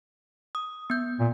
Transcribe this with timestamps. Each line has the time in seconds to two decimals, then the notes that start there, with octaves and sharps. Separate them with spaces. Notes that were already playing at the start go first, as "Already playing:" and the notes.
0.55 D#6
0.90 B3 G6
1.20 A#2